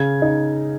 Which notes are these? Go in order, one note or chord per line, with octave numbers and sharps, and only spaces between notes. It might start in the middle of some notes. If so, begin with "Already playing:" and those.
Already playing: C#3 G#6
D#4